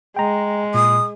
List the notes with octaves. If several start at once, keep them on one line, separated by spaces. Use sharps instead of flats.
G#3 G5 A#5
A#2 D#6